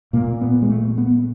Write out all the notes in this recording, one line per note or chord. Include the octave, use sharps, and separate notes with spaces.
A#2 A#3
B3
G#3
A3
B3